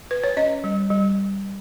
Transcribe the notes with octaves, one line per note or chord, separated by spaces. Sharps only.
B4
C#5
C#4 D#5
G3
G3